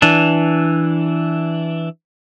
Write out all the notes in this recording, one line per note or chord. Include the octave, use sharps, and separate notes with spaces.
E3 D4